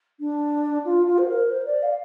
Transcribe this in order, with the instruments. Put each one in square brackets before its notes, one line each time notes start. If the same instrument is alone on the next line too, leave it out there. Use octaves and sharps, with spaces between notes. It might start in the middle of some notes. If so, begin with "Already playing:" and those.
[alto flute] D4
F4
F4
C5
A#4
C5
D5
F5